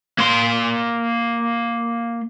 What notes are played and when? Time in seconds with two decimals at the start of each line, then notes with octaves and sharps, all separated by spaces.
0.18 A#3 C6